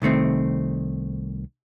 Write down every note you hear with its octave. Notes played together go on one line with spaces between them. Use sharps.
C2 D#3 A3 C4